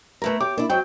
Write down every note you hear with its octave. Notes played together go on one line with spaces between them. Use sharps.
A3 E4 A#4 B4 A#5
G4 C#5 D6
A#3 D4 E4
G#2 F#3 C4 G5 G6